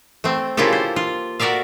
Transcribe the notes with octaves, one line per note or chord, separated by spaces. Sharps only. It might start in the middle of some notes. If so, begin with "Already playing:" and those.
A3 C4
C#3 A#3 E4 F4 G4 A4
C5
F4
F#4 A#4 D5 E5 F5